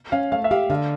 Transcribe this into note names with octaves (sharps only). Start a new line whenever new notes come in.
C#4 F5
A3 F5
E5
G4 F5
D3 F5